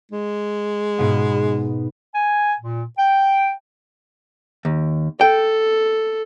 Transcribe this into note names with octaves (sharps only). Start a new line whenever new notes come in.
G#3
G#2 B2 B3
G#5
A#2
G5
D#2
A4 G5